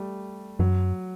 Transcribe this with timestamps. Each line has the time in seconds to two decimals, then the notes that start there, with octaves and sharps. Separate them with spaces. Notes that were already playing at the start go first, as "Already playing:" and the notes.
Already playing: G3 A3
0.59 F#2 F#3